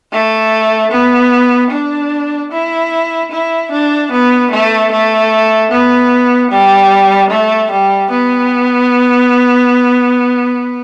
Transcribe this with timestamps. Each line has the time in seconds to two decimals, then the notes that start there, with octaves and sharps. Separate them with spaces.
0.12 A3
0.91 B3
1.71 D4
2.52 E4
3.31 E4
3.72 D4
4.11 B3
4.51 A3
4.91 A3
5.71 B3
6.51 G3
7.30 A3
7.71 G3
8.11 B3